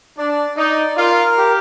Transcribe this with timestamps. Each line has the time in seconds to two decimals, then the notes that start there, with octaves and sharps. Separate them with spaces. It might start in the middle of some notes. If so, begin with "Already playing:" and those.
0.17 D4 D5
0.57 D#4 D5
0.97 F4 A#4
1.37 G4